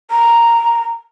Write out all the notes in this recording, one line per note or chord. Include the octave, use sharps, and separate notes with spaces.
A#5